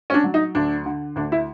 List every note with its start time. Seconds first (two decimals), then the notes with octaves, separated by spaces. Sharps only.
0.10 C#4
0.14 D4
0.24 F#3
0.34 D#4
0.55 D2 D4
0.86 D3
1.16 D2 D4
1.32 E4